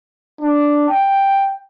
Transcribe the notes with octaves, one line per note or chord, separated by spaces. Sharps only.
D4
G5